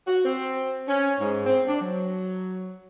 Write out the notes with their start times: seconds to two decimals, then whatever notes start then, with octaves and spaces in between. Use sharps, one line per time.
0.07 F#4
0.25 C4
0.88 C#4
1.20 G#2
1.45 C4
1.67 D4
1.80 F#3